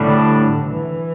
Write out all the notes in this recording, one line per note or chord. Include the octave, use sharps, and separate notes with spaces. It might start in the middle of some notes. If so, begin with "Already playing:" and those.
Already playing: A2 D3 G3 D4
E3